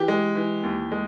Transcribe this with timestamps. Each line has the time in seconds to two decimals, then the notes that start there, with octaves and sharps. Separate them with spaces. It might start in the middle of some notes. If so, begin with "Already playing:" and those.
Already playing: E3 G4
0.08 G#3
0.35 E3
0.63 D#2
0.92 G#3